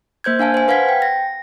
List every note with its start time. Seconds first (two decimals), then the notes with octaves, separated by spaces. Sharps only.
0.24 A#3 C5 G6 G#6
0.39 D4 F5 G#5 A5
0.54 C5 G#5
0.68 B4 F5 F#5 G#6 B6
0.89 G5
1.02 A#6